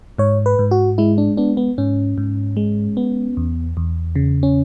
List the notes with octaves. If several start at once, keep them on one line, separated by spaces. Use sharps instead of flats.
G#2 C#5
B4
G#2
F#4
G#3 E4
D4
B3 D4
B3
G#2 C#4
G#2
G#3
B3
E2
E2
C#3
C#4